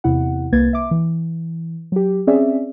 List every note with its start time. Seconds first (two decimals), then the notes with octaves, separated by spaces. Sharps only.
0.04 E2 C3 E4 F#5
0.52 C2 A#3 B4 G#6 A6
0.73 E5 D6
0.91 E3
1.92 F#3 G4
2.27 C4 C#4 G#4 D5 E5